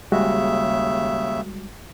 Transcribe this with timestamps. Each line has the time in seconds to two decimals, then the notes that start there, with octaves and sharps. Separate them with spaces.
0.12 D#2 C#3 G3 G#3 F#4 E5